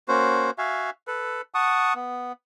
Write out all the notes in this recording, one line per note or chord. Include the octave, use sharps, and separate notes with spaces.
A#3 C#4 F#4 C5
F#4 E5 F5 G#5
A4 B4
F#5 A5 C#6 D#6
B3